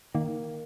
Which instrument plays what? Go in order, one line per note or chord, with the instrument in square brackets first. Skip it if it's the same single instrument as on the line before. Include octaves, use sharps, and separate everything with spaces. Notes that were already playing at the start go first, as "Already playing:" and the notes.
[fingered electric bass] D#3 [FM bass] A#3